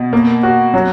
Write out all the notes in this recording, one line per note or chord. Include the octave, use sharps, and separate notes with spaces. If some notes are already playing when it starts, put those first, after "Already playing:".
Already playing: B2
A#3
F#4
F#3